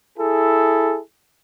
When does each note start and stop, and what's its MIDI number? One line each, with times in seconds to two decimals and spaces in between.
0.18 0.98 64
0.18 0.98 68
0.18 0.98 69